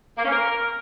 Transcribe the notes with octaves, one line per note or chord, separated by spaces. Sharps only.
A#3
C#4
A#4